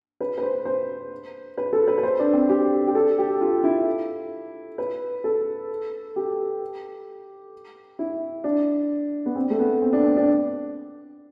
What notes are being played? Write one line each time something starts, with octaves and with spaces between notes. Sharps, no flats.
B4
B4
C5
C5
B4
A4
B4
B4
C5
D4
C4
G4
G4
A4
G4
F4
E4
B4
A4
G4
E4
D4
B3
C4
A3
B3
C4
D4
C4
D4